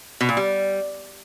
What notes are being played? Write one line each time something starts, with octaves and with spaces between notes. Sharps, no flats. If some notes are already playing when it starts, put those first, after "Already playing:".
B2
A#2
G3